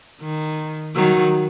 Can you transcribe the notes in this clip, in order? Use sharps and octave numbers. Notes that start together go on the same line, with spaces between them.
D#3
D#3 F#3